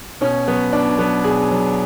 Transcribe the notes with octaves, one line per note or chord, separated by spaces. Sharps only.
B2 C#4
F#3 B3
B2 D4
F#3 B3
B2 G#4
F#3